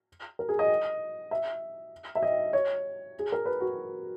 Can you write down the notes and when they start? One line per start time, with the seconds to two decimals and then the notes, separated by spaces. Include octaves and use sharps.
0.39 A#4
0.49 G#4
0.59 D#5
1.31 E5
2.15 E5
2.23 D#5
2.53 C#5
3.19 G#4
3.32 A#4
3.46 B4
3.60 F#4